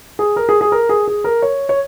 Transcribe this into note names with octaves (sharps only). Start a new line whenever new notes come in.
G#4
A#4
G#4
G#4
A#4
G#4
G#4
A#4
C#5
C#5